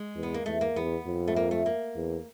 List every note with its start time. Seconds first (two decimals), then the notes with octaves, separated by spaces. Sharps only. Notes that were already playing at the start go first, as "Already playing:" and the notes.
Already playing: G#3
0.16 E2
0.23 B3
0.34 A#3
0.46 E2 A3
0.61 A#3
0.76 E2 B3
1.07 F2
1.28 A3
1.36 A#3
1.51 A3
1.66 A#3
1.96 E2